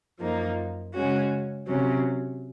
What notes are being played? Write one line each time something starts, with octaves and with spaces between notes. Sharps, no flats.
F#2 F3 A#3 D#4
C#3 G#3 C#4 F#4
C3 F#3 C#4